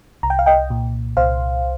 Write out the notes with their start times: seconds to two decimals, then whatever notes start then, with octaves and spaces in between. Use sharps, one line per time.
0.23 C2 A#5
0.30 G5
0.39 F5
0.46 D#5 G5
0.70 A#2
1.17 C2 C5 F5